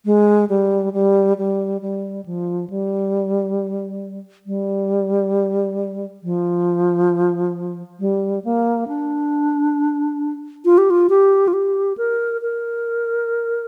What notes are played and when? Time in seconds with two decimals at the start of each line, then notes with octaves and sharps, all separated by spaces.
0.05 G#3
0.49 G3
0.93 G3
1.38 G3
1.82 G3
2.26 F3
2.70 G3
4.47 G3
6.23 F3
8.00 G3
8.45 A#3
8.88 D4
10.65 F4
10.78 G4
10.90 F4
11.10 G4
11.48 F4
11.53 G4
11.98 A#4
12.42 A#4